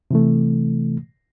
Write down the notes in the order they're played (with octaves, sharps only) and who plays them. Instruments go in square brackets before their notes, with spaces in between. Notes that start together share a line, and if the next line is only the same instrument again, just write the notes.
[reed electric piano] C3 E3 A3